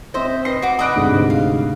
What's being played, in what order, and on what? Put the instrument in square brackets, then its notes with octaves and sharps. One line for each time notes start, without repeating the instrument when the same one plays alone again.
[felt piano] C4 [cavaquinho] C5 D#5 E5
[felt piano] B4 C7 [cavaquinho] D#5
[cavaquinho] F#4 D6
[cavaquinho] D5 D#5 B5 [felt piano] D#6 F#6 D7
[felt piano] D2 G#2 C3
[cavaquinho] F5